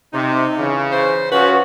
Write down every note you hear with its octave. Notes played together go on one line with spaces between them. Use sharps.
C3 D#4
C#3 E3
C5
F3 C#4 F#4 B4